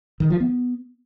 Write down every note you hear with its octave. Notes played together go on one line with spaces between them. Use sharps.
D#3
F3
B3